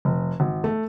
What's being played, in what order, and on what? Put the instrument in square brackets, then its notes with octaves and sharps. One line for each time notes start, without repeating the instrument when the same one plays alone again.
[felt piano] F1
G#1
A3